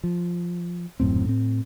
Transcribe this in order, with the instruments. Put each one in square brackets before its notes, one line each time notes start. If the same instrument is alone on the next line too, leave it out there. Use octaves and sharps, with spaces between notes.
[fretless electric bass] F3
D#1 F#2 A2 C4
A2 C4